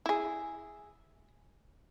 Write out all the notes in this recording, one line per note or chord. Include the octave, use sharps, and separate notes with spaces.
E4 G#4